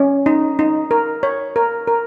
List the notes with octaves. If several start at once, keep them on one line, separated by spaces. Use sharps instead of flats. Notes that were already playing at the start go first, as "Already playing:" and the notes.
Already playing: C#4
D#4
D#4
A#4
C#5
A#4
A#4